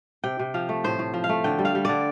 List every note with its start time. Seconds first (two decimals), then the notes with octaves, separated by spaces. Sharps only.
0.24 C3 G5
0.39 C3
0.54 F3 F5
0.69 A3
0.84 A2 C5
0.99 A2
1.14 F3
1.24 F5
1.29 A3
1.44 D3 G5
1.59 G3
1.65 F5
1.75 G3
1.85 D3 D5